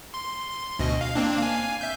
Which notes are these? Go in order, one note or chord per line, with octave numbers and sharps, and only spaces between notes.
C6
D2 B2 D#5
F5
A#3 C4 D4
F5 G#5
E5 G6